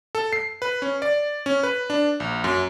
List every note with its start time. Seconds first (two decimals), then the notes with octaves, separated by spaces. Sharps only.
0.15 A4
0.33 C7
0.62 B4
0.82 C#4
1.02 D5
1.46 C#4
1.63 B4
1.90 D4
2.20 A#1
2.44 F#2